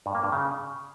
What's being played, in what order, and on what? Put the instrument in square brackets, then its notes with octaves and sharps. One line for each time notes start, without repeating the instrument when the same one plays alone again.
[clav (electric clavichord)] G2
A#3
G2
C#3